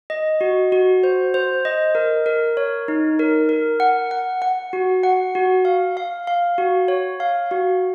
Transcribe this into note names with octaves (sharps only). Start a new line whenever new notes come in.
D#5
F#4
F#4
C5
C5
D#5
A#4
A#4
C#5
D#4
A#4
A#4
F#5
F#5
F#5
F#4
F#5
F#4
F5
F5
F5
F#4
C#5
F5
F#4